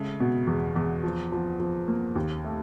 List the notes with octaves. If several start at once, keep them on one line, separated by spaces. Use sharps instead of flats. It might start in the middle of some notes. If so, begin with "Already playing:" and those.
Already playing: C#3 G#3 A3
B2
E2
E2
F3
F3
F3
A#3
D#2
A3